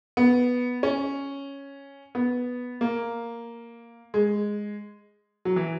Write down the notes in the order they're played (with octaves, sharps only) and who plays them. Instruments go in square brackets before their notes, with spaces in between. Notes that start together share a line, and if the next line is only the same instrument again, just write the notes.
[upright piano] B3
C#4
B3
A#3
G#3
F#3
E3